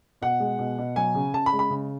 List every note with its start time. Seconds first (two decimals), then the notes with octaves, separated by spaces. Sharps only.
0.22 B2 F#5
0.40 G#3
0.59 B2
0.78 B2
0.96 F#3 G#5
1.15 C#3
1.34 C#3 A5
1.46 B5
1.53 G#3
1.59 B5
1.70 C#3